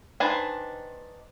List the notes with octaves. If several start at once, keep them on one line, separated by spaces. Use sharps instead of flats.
D#3 D4 B4 C5 G#5